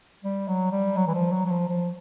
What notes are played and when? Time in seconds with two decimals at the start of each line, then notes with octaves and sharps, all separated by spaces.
0.24 G3
0.48 F#3
0.72 G3
0.96 F#3
1.07 E3
1.15 F3
1.33 F#3
1.46 F#3
1.51 F3
1.69 F3